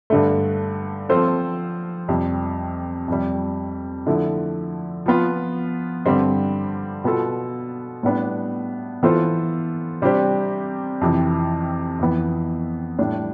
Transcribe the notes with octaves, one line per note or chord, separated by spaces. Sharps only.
G2 D3 A3
F3 C4 F4 A4 C5
F2 C3 G3
F2 C3 G3
D3 F3 A3 E4
F3 B3 F4
G2 D3 G3 C4
B2 B3 F4 A4
A2 G3 B3 D4
E3 B3 F4 A4 C5
C3 G3 D4 G4 C5
F2 C3 E3
F2 E3 B3
A2 G3 D4